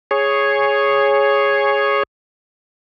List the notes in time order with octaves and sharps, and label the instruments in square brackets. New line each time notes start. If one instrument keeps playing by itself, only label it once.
[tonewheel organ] G#4 C#5